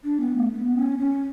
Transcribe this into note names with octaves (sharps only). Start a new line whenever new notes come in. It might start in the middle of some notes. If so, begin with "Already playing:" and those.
D4
B3
A3
B3
C#4
C#4